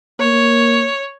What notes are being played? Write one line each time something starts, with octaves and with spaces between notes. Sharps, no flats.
A#3 C#5